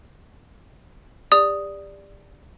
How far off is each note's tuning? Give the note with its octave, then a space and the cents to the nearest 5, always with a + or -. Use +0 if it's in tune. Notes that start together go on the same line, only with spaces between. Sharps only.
G4 +35 D5 +0 D#6 +0